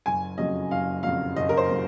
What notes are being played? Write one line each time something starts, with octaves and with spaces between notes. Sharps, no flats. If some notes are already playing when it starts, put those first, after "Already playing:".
F#1 G#5
F2 C#3 F#3 D#5
F#1 F5
F2 C#3 F#3 F5
F#1 D#5
A#4
C5
C#3 F#3